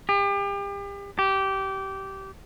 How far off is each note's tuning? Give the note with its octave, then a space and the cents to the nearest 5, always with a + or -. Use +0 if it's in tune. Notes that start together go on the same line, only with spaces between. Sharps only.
G4 +35
G4 -20